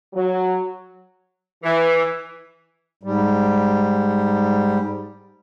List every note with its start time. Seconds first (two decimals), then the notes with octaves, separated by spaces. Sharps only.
0.14 F#3
1.63 E3
3.03 G#2 G3